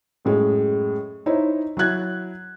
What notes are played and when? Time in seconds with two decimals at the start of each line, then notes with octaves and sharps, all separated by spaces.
0.25 F#2 A2 G#3
1.26 D#4 E4 C5 C#5
1.77 F#3 E4 F#6 G#6